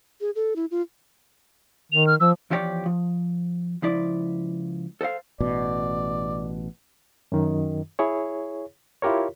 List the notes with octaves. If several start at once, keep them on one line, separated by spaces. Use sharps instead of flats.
G#4
A4
E4
F4
D#3 F7
F6
F3 E6
E2 F3 E4 G4 C#5 D5
F3
C#2 F3 E4 D5
A4 C5 D#5 F5
A1 B2 D5
F#2 D#3
E4 G#4 C#5
E4 F4 G4 A#4 C#5